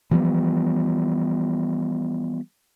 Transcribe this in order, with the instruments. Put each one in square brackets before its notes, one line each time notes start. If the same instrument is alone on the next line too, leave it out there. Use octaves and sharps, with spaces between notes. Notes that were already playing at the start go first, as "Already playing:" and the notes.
[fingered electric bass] E3 F3 G3 B3